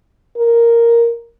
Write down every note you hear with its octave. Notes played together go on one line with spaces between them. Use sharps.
A#4